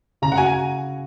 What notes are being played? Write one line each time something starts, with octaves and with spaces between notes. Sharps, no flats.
C#3 A#5
F#5
F#4 G#5